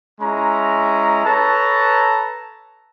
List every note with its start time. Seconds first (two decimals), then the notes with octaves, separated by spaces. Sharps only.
0.21 G#3 C#4 E4 A#5
1.25 A4 B4 C#5 A5 A#5